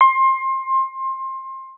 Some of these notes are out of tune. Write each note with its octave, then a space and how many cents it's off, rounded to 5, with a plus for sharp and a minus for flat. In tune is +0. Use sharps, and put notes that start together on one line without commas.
C6 +25